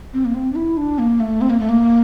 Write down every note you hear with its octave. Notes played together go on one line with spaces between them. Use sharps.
C4
A#3
C4
D4
E4
D4
A#3
A3
C4
A#3
A3
A#3